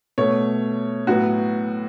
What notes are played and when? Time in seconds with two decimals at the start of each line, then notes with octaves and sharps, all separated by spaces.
0.18 B2 A3 C#5
1.07 A2 F#3 B3 F#4